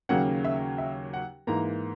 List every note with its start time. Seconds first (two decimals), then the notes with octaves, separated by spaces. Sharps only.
0.09 D#2 C#3 F#3 A#3 C#4 F#5
0.44 E5
0.78 E5
1.13 F#5
1.47 G#2 E3 A#3 A#5